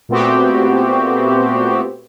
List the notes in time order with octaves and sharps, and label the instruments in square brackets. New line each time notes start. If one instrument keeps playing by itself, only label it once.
[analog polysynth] A#2 A3 B3 C4 F#4 G4